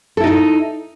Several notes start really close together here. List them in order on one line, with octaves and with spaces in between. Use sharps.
A4 E4 D#4 D#5